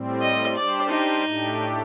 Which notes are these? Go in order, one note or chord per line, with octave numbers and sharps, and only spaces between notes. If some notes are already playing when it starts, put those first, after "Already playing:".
Already playing: A2 G3 C4
D#5
G3 D4 G4 C5 D5
D#4
A2 A3 D4 G4